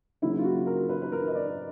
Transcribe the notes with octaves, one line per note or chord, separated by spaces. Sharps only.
C#3 F#3 A#3 C#4 E4
F4
F#4
A#4
B4
B4
A#4
D#5
D5